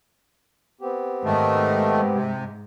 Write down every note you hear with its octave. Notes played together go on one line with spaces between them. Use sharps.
B3 C4 G4
G#2 D#3 A3
C3